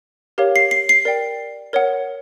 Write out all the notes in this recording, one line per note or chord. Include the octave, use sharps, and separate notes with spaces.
G4 A#4 C#5 F5
C7
C7
C7
A#4 D5 G5
A#4 C#5 F#5